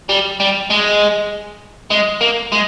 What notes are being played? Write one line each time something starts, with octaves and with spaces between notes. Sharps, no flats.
G3
G3
G#3
G#3
A#3
G#3